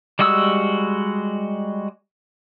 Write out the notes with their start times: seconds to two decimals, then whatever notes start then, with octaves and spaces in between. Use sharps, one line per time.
0.19 G3 G#3 F#4 D#6 E6